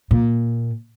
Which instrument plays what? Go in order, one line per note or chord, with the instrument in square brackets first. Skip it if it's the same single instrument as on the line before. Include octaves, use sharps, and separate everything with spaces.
[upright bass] A#2